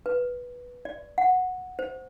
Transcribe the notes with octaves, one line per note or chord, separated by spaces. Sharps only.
B4
D5
F#5
C5